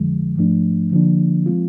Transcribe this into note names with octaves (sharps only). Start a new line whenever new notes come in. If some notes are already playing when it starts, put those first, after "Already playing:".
Already playing: F2 D3 F3 G#3
G#2 F3 A3 D4
D3 F3 A#3 D4
F3 G#3 C4 F4